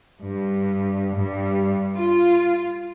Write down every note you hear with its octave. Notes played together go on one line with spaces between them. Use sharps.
G2
G2
F4